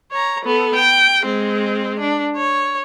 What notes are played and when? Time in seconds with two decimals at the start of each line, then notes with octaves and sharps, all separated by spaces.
0.12 C#5 A#5
0.45 B3 A4
0.76 G5
1.23 G#3 C4
2.00 D4
2.36 C#5